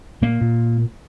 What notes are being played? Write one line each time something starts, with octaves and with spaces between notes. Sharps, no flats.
A#2 A#3
A#2